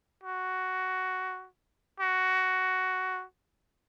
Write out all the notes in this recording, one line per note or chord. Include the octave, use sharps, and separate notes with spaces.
F#4
F#4